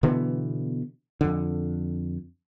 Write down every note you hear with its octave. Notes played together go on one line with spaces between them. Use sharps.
B2 D3 E3 B3
F2 D3